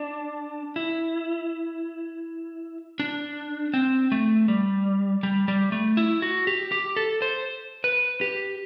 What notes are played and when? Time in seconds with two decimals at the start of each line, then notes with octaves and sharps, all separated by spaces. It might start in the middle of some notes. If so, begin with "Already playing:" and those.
Already playing: D4
0.76 E4
3.00 D4
3.74 C4
4.12 A3
4.48 G3
5.23 G3
5.48 G3
5.72 A3
5.97 E4
6.22 F#4
6.47 G4
6.72 G4
6.96 A4
7.22 C5
7.84 B4
8.21 G4